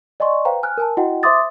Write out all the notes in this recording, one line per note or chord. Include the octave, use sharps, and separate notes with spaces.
D5 D#5 G#5 C6 C#6
B4 C5 F5 G5 A#5
G#5 F6 F#6
A#4 G#5 A5
E4 F#4 D#5 F#5 G5
C5 E5 C6 D6 D#6 A6